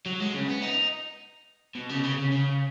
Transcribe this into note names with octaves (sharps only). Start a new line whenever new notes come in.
F#3
G#3
C#3
B3
D#4
B2
C#3
B2
C#3
C#3
C#3